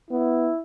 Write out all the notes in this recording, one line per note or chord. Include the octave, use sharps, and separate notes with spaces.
B3 E4